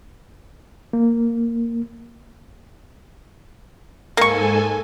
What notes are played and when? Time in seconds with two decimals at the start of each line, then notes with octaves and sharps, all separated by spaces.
0.93 A#3
4.17 G#2 A#3 A4 G#5 C#6